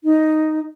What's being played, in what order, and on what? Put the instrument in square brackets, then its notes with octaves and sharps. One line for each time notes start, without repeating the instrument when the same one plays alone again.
[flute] D#4